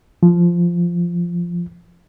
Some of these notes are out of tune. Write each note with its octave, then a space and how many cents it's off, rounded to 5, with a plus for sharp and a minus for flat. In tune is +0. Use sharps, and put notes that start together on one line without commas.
F3 -10